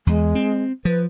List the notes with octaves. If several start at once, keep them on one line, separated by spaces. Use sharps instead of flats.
E2 G#3
C4
F3 B4